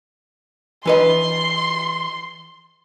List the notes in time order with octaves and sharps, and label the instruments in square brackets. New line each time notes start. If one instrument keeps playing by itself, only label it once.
[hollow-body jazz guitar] E3 B4 D#5 [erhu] C6